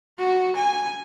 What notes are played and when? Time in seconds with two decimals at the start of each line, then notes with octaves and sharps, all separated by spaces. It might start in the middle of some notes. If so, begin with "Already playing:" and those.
0.19 F#4
0.56 G#5